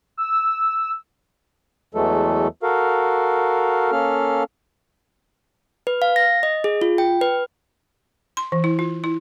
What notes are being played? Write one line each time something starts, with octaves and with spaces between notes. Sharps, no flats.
E6
E2 E3 F#3 G#3 A3 A4
F#4 A4 A#4 F5
A#3 C#4 A4 F5 F6
B4
F5
A#6
D#5
G#4
F4
G5
B4
C6
E3
E4
F4
E4